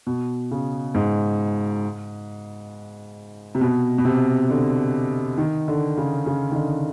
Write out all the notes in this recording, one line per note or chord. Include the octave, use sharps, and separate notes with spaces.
B2
C#3
G#2
C3
B2
B2
C3
D3
D#3
D3
C#3
C#3
D#3
D3